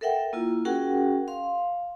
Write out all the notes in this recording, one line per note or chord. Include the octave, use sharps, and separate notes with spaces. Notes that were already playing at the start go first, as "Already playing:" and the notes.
A4 A#4 E5 F#5 G5
A#3 E4 F4
C#4 F#4 G#4 A#4 F#5 G5
F5 C6